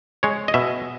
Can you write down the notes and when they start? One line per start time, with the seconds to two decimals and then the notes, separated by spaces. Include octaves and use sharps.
0.23 G#3 C#5
0.48 D#5
0.54 B2 E5